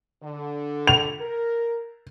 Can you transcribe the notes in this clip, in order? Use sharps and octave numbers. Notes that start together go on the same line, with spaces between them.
D3
F7
A#4